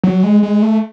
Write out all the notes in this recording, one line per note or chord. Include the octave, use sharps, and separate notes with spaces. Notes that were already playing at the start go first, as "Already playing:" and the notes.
F#3
G#3
G#3
A3